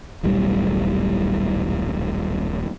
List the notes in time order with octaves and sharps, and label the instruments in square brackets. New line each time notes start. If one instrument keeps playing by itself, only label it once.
[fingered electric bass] D#1 B1 A2 G3